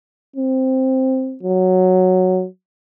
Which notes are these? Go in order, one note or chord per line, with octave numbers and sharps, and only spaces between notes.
C4
F#3